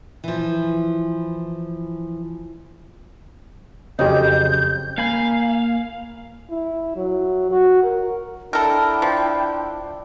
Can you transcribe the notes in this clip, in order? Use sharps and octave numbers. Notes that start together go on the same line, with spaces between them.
E3 F3
F2 C#3 F#3 G4 C#5 D#5 G6
A#3 F5 G#5 B5
E4
F#3
F#4
A#4
D4 E4 A4 A#4 G5
F3